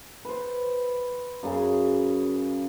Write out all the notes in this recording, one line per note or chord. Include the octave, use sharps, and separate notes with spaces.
B4 C5
F#2 C#3 G#4